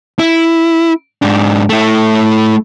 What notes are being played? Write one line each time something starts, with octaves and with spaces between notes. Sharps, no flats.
E4
G#2 D4
A3 E4